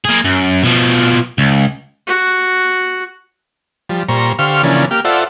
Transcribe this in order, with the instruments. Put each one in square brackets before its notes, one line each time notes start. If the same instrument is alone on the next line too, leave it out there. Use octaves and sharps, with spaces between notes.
[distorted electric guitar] A#3 G#4
F#2
B2 F3
C#2
[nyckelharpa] F#4
[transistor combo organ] F3 G3
A#2 G3 C5 A#5 C#6
D3 G4 C5 F5 C#6 F6
C#3 E3 F3 A#3 C#4 D4
A#3 G4 F6
F4 A4 C5 D5 E5 F#5